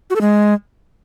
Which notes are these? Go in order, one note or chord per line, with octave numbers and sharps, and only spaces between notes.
F#4
A4
G#3